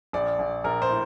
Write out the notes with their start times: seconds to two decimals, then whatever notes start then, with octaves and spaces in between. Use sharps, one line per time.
0.13 A#1 D5
0.39 A#1
0.64 A#1 A#4
0.82 C5
0.90 A2